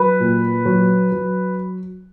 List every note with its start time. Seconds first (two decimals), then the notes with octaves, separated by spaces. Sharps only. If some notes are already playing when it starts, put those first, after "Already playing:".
Already playing: F#3 B4
0.20 A#2
0.66 F#3
1.12 F#3